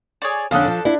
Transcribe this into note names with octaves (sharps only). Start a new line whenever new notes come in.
G#4 C#5 D5
F2 D3 C#4 D4 A4 F5 D#6 F#6
F3
D4 E4 F4 B5